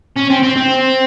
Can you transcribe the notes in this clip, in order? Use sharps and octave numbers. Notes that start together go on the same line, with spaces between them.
C#4
C4
C4
C4